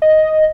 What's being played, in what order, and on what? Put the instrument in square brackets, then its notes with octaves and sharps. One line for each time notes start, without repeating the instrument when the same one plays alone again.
[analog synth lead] D#5